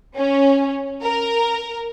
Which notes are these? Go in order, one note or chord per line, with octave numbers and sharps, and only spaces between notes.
C#4
A#4